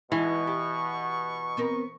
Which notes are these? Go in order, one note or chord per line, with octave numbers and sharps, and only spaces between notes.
B2 E3 G#3 C#6
G4
B3 C4 A#4